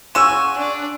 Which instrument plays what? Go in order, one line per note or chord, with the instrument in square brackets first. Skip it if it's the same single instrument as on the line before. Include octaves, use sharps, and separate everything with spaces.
[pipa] C#3 C#4 F#4 [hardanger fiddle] G#5 [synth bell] C6 C#6 [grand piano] E6 E7
[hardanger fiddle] D4